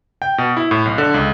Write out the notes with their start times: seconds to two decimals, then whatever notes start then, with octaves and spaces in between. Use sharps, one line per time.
0.22 G5
0.38 B2
0.57 E4
0.71 A2
0.85 B1
0.98 D3
1.14 C#2